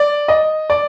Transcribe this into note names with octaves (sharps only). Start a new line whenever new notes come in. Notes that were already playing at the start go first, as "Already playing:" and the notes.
Already playing: D5
D#5
D5